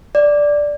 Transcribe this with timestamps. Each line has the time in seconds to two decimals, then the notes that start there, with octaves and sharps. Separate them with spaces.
0.15 D5